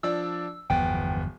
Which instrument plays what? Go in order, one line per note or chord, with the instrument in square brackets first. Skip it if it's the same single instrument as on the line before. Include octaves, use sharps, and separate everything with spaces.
[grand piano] F3 D4 D5 [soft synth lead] E6
[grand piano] D1 B3 [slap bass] G1 E2 F3 [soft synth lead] G5